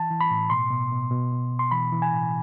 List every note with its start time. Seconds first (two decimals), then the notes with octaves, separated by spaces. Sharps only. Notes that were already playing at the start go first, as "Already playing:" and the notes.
Already playing: E3 A5
0.10 E3
0.21 B5
0.31 A2
0.50 B2 C6
0.70 B2
0.91 B2
1.11 B2
1.32 B2
1.52 B2
1.59 C6
1.71 E3 B5
1.92 E3
2.02 G#5
2.11 A2